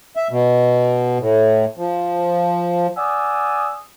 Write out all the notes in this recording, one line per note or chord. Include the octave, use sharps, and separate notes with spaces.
E5
B2
A2
F3
D5 F#5 G#5 D#6 E6